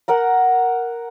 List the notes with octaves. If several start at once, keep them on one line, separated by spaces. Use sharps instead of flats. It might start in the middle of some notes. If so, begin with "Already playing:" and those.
A#4 F#5 A#5